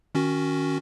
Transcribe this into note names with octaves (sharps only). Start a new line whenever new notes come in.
D#3 C#4 F#4